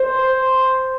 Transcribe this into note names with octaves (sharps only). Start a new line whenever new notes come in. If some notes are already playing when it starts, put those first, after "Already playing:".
Already playing: C5